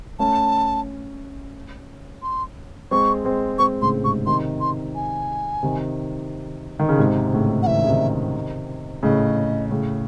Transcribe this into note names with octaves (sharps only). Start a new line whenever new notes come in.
A3 C#4 A5
C6
G#3 C4 C#6
G#3 C4
G#3 C4 C#6
A2 C#3 C6
G#2 C3 C#6
C3 D#3 C6
C6
G#5
C3 D#3
D#3
C#3
G#2 C3
A2 C#3
F#5
E3 E5
D#3
C#3
C3 D#3
A2 C#3 D#5
A2 C#3